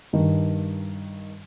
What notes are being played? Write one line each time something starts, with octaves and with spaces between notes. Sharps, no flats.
G2 D#3